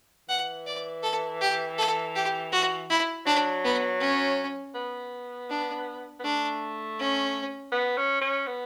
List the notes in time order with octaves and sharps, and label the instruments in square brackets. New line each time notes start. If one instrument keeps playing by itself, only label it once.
[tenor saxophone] E3 [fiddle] F#5
[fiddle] D5
A4
G4
A4
G4
F#4
E4
[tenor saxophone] F#3 [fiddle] D4
[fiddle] B3
C#4
[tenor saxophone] B3
[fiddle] D4
[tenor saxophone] B3
[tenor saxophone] A3 [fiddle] D4
[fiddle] C#4
[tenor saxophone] B3
C#4
C#4
B3